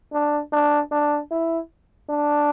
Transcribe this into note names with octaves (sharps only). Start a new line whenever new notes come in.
D4
D4
D4
E4
D4